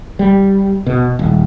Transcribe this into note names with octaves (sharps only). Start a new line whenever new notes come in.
G3
B2
D#1